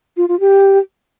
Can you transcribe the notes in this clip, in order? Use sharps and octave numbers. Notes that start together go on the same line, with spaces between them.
F4
F4
G4